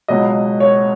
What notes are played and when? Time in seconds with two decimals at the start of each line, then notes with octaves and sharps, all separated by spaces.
0.08 C#2 B2 F#3 D#5
0.60 C#5